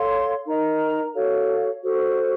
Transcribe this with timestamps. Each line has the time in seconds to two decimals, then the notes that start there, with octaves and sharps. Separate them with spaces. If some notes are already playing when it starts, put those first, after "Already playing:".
Already playing: A4 C#5 F5 C6
0.46 D#4 A#4 D#5 A#5
1.15 F#4 A4 C#5 F5
1.82 F#4 A4 C5